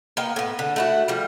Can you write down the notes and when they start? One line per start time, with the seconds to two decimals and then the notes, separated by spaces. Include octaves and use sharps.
0.17 A#3 B3 G5
0.36 A2 B3
0.59 D3
0.76 A3 E4 F#4
1.08 F3 G3